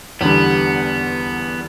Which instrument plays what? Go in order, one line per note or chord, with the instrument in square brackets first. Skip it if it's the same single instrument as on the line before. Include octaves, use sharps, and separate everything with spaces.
[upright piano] E2 D3 G3 [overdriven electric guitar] B3